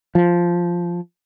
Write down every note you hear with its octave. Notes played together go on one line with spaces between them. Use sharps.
F3